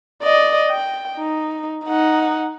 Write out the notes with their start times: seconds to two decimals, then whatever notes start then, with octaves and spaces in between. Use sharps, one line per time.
0.23 D5 D#5
0.70 G5
1.17 D#4
1.85 D#4 F#5